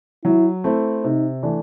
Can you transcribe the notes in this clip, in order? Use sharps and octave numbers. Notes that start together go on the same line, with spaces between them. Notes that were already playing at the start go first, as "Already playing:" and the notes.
F#3 E4
A3 C4 E4
C3 D#4
E3 A3 D4